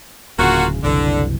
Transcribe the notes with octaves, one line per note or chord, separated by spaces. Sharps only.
D1 C#3 A#3 F4 F#4
F#1 C2 D3 E3